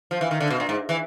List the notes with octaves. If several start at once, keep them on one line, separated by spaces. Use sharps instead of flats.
F3
E3
D#3
D3
B2
A#2
G#2
E3